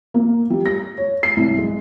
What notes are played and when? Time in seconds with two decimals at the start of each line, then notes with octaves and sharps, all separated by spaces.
0.14 A#3
0.50 G3
0.66 A#6
0.98 C#5
1.23 C7
1.36 C2
1.58 G#3